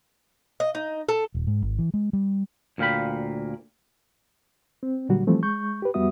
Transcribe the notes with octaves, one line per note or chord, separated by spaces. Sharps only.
D#5
D#4
A4
D#1
G#2
G#1
E3
G#3
G3
D2 A#2 F5 G5 B5
C4
A#2 D3 F#3 G3 F#4
E3 F3 G3 A3 C4
G#3 C#6 G6
G4 B4
F2 G3 B3 F#4 E5 D#6